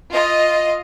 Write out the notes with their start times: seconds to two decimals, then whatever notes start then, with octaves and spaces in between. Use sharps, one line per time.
0.11 F4 D#5